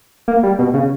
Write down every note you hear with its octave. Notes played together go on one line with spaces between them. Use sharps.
A#3
G3
B2
C#3